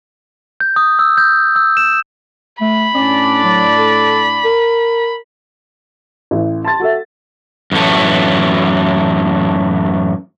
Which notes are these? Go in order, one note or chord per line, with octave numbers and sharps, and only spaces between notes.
G6
D#6
E6
G6
E6
E7
A3 B5
A2 C#4 D4 D5
F#3
A4
A#4
A1 E3
A5 C6 A6
F#4 A4 E5
F#2 A2 E3 A3